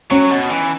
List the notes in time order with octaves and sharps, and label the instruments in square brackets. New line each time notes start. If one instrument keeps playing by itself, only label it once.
[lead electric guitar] F#3 [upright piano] C#4
[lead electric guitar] B2
E3